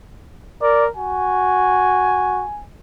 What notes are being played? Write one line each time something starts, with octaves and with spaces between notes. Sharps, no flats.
A#4 D5
F#4 G#5